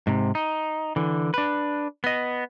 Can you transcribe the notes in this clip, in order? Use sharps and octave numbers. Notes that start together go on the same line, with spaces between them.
G#2 C3
D#4
D3 E3
D4 B4
B3 D#5